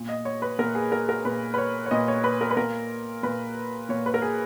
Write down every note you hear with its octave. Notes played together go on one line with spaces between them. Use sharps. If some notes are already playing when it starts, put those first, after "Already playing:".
Already playing: A#2
D#5
C#5
B4
A#2 A#4
G#4
A#4
A#4
A#2 B4
B4
C#5
C#5
A#2 D#5
C#5
B4
A#4
B4
A#2 A#4
A#2 B4
A#2 C#5
B4
A#4
G#4